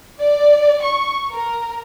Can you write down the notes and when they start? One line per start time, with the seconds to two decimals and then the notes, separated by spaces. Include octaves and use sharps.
0.19 D5
0.81 C#6
1.32 A#4